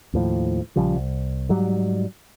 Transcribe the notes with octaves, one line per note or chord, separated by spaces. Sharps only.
D#2 A2 F3
A#1 C#3 F3 G3
C2
G#2 F#3 G3